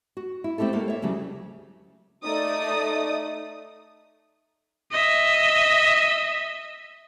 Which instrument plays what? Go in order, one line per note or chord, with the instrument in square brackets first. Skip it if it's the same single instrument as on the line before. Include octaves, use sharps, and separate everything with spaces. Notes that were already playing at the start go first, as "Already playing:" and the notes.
[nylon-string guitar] F#4
E4
A3 C4 E4 G4 A4
G3 A3 A#3 F#4
C#5 E5
D2 C#3 F#3 G3
[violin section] A3 D#4 D5 D#6
[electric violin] D#5 E5